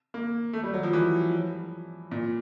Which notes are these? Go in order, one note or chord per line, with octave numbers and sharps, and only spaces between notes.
A#3
A3
G3
F#3
F3
E3
A#2